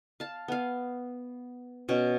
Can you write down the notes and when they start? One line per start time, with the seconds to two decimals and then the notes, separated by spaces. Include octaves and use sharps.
0.20 F5 A5
0.48 B3 F5
1.89 B2 C#4